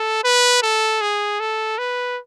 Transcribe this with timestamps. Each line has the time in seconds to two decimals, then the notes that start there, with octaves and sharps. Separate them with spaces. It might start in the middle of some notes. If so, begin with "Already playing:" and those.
Already playing: A4
0.24 B4
0.62 A4
1.01 G#4
1.40 A4
1.78 B4